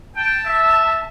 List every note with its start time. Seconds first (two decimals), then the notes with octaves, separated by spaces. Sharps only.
0.16 G5 A5
0.46 E5